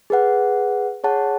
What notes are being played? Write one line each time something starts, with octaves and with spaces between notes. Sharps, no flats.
G#4 B4 F#5
G#4 C#5 F#5 A5